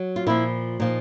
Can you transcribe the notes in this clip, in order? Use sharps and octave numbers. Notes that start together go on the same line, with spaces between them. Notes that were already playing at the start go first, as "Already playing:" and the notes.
Already playing: F#3
F4
A#2 F3 E4
A#2 F3 D#4